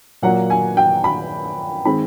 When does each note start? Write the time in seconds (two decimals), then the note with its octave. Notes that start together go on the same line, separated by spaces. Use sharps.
0.22 A#2 F#3 A#3 F#5
0.50 G#5
0.77 G5
1.04 B5
1.85 D#3 G#3 C4 B5